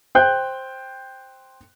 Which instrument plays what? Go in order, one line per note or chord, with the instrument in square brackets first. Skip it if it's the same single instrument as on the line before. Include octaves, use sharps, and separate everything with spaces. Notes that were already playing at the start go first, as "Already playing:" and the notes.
[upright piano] C5 G5 F#6 G6